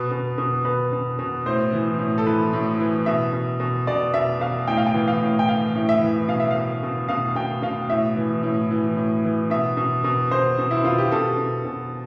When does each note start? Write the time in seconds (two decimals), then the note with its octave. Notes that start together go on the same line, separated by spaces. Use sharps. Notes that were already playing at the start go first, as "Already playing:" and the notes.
Already playing: B2 B4
0.11 B2
0.38 B2
0.65 B2 B4
0.92 B2
1.19 B2
1.46 A2 C5
1.73 E3
1.99 A2
2.18 A4
2.26 E3 B4
2.53 A2
2.80 E3
3.06 B2 E5
3.33 B2
3.60 B2
3.87 B2 D5
4.14 B2 E5
4.41 B2 F5
4.68 A2 G5
4.77 F5
4.86 G5
4.94 E3
5.08 F5
5.22 A2
5.39 G5
5.48 E3 F5
5.75 A2
5.89 E5
6.01 E3
6.28 B2 F5
6.40 E5
6.51 B2 F5
6.83 B2
7.08 B2 F5
7.35 B2 G5
7.62 B2 F5
7.89 A2 E5
8.16 E3
8.43 A2
8.71 E3
8.97 A2
9.24 E3
9.50 B2 E5
9.77 B2
10.04 B2
10.31 B2 C5
10.59 B2
10.71 E4
10.84 B2 F4
10.98 G4
11.12 B2 A4
11.38 B2
11.65 B2